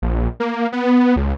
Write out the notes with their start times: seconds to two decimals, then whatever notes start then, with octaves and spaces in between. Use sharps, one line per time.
0.02 A#1
0.40 A#3
0.72 B3
1.16 C#2